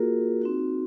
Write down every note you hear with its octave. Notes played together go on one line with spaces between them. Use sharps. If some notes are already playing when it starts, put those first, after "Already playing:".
Already playing: A#3 F4 F#4 G#4 A#4
C4 D#4 F#4